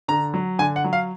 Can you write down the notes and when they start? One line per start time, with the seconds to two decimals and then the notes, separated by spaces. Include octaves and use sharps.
0.08 D3 A#5
0.34 F#3
0.59 D3 G#5
0.76 F#5
0.84 F#3
0.93 F5